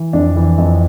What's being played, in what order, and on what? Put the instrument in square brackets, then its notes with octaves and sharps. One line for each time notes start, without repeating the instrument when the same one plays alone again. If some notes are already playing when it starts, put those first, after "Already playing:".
Already playing: [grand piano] E3
F2 D4
E3
F2